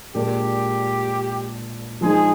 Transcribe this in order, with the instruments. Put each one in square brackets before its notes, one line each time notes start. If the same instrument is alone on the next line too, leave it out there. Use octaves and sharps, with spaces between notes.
[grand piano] A#2 G#3 D4 [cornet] G4
[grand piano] F3 G#3 D#4 [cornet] G#4